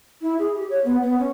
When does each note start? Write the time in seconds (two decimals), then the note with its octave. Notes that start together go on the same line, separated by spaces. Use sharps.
0.21 E4
0.39 G#4
0.55 G4
0.70 C#5
0.85 B3
1.03 B3
1.18 C#4